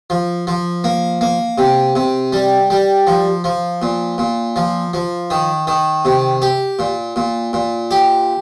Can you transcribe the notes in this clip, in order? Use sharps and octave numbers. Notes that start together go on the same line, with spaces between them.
F3
F3
A#3
A#3
C3
C3
G3
G3
F3
F3
A#2
A#2
F3
F3
D#3
D#3
C3
G4
A#2
A#2
A#2
G4